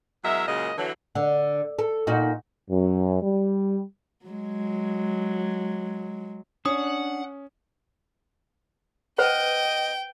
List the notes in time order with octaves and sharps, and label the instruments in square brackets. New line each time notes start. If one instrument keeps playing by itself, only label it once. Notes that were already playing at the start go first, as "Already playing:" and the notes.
[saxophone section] E2 F#3 G#3 A#4 E5
A#2 C#3 F#3 G#3 A#3 D#5
D3 E3 F#3
[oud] D3
A4
A#2 D#4 F#4
[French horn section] F#2
G3
[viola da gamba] F#3 G#3
[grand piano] C#4 [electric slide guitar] D4 D5 [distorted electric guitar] F#5 [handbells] D#6
[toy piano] B4 C5 F#5 [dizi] D#5 [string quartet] G5